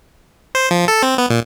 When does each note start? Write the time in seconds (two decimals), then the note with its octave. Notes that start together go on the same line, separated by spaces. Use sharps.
0.55 C5
0.71 F3
0.88 A4
1.03 C4
1.18 B3
1.30 A#2